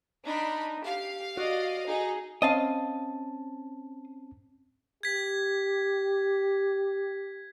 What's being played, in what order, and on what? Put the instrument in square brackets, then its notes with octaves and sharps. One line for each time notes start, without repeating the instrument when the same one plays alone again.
[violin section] D4 B5 [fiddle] D#4
[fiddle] G4 [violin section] F5
[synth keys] F#4 [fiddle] D5 D#5
[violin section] D#4 [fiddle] G#4
[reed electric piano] C4 C#4 A5 [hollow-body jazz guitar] D#5 F5
[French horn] G4 [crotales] G#6 B6